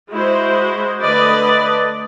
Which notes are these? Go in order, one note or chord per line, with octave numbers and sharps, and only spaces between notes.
G#3 E4 F#4 C5
D3 A3 B4 D5 D#5